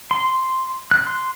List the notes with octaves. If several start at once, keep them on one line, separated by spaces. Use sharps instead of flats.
C6
F#6
C6